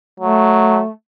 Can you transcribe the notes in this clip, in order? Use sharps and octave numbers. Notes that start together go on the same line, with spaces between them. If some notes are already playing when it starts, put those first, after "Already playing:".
F#3 A3